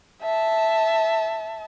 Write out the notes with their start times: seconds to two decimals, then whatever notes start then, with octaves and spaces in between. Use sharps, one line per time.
0.23 E5 A5